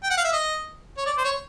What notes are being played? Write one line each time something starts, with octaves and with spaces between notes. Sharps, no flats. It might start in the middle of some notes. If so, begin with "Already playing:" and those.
G5
F#5
F5
E5
D#5
C#5
D5
C5
C#5